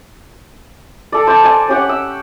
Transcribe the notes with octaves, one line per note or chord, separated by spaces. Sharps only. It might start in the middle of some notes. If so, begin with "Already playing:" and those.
A4 D5
C5 A5
D5 G#5
C#4 G4 F#5
E6